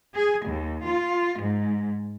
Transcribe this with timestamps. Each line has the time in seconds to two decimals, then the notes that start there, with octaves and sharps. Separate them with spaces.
0.15 G#4
0.47 D#2
0.85 F4
1.41 G#2